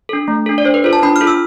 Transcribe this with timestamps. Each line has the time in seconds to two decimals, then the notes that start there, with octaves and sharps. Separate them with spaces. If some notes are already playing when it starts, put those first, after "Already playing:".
0.09 D4 A4
0.28 A3
0.46 D4 A4
0.58 D5
0.65 D4 C5
0.74 B4
0.84 F4 A4 C5
0.93 A5
1.03 D4 B5
1.16 F6
1.21 F4 A4
1.27 E6